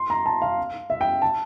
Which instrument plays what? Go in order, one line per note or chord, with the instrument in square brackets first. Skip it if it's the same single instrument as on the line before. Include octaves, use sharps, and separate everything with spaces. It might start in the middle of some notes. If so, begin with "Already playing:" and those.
Already playing: [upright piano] C6
A#5
A5
F5
E5
G5
A5